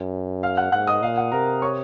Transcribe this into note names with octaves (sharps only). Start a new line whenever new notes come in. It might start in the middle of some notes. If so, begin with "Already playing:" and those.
Already playing: F#2
F5 F6
F#5 F#6
G#2 F#5 F#6
D#5 D#6
A#2 F5
F#5
C3 A#4 A#5
C#5 C#6